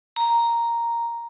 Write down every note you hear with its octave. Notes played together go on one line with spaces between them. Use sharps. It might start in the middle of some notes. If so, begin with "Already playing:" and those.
A#5